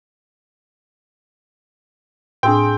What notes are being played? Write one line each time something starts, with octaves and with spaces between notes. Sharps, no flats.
A2 C4 D4 G#4 G5